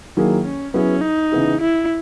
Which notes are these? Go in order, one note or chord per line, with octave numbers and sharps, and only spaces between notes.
D#3 F#3 A#3 E4 G#4
C#4
F#3 B3 C#4 E4 G#4
D#4
C#3 E3 B3 E4 G#4
E4